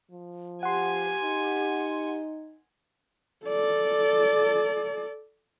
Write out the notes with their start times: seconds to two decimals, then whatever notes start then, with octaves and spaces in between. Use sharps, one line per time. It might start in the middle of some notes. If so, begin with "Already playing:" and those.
0.11 F3
0.63 G4 F#5 G#5 C6
1.23 D#4
3.46 A4 D5